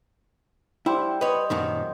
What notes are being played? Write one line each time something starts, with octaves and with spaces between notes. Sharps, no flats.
G3 E4 C5 F#5
B4 C#5 D#5
F#2 A#2 D#3